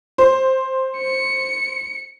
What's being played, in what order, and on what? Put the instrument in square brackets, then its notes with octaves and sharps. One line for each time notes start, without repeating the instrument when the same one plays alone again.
[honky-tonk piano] C5
[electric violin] C#7